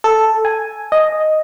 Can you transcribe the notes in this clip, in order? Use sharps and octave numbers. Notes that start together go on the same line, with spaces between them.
A4
G#5
D#5